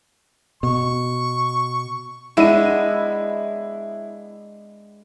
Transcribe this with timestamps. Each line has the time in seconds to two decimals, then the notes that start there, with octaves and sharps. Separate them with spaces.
0.63 B2 C#6
2.37 G#3 B3 D4 E4 D#7